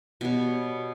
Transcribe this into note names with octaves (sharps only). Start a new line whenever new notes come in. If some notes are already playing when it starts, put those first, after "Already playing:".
B2 G3 C#5